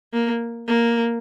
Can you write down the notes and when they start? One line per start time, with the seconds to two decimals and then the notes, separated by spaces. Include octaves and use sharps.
0.13 A#3
0.68 A#3